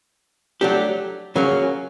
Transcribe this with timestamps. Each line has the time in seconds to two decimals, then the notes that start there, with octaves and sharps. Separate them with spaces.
0.61 F#3 A3 D4 G4
1.36 C#3 F#3 A#3 C#4